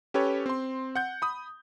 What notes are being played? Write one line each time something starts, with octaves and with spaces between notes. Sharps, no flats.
C#4 G4 A4 B4 C#5
C4 C6
F#5 G6
B5 D#6